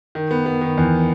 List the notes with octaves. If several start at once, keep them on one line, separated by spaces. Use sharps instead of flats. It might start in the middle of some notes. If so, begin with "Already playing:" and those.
D#3
B3
B3
D#3
E2